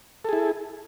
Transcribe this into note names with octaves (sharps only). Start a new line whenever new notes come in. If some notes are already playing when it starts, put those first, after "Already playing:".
E4 G#4 A4